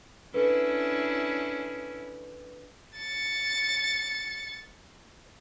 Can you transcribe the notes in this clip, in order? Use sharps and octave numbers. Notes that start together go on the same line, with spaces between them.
C#4 D4 E4 A4 B4
A6 C#7